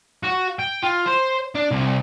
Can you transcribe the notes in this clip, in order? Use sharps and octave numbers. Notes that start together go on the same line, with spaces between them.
F#4
G5
F4
C5
D4
C2